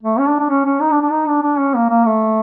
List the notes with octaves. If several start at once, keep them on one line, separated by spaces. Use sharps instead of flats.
A3
C#4
D4
D4
C#4
C#4
D#4
D4
D4
D#4
D4
D4
C#4
A#3
A#3
A3